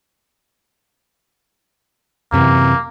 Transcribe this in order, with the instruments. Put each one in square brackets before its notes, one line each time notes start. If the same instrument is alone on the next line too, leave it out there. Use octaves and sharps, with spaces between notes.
[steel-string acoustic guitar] F#2 C3 E3 [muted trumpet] A#3